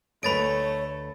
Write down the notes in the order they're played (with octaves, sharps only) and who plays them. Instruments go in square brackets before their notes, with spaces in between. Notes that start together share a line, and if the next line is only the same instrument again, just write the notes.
[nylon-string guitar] D2 B4 D#5 [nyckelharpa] A3 [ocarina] C#5 [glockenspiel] B5 A6 D7